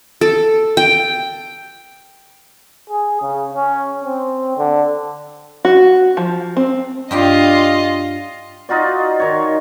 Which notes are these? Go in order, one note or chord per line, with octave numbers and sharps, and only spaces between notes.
A4
G5
G#4
C#3
C#4
C4
D3
F#4
F3
C4
G2 F4 G4 D#5 G5
D#4 F4 F#4 D5
D#3 C#5